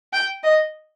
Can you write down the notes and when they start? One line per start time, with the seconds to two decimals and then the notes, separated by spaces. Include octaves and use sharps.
0.13 G5
0.43 D#5